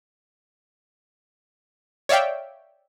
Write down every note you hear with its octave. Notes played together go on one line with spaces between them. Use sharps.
C#5 D5 E5 F5 G5